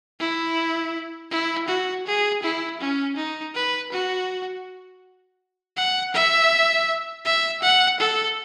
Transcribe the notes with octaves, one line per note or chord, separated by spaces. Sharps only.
E4
E4
F#4
G#4
E4
C#4
D#4
B4
F#4
F#5
E5
E5
F#5
A4